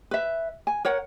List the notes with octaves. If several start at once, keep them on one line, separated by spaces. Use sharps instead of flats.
B4 E5
G#5
A#4 C#5 F#5